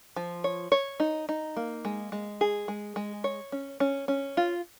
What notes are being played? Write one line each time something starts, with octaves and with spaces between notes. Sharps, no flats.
F3
C#5
C#5
D#4
D#4
A#3
G#3
G#3
G#4
G#3
G#3
C#5
C#4
C#4
C#4
F4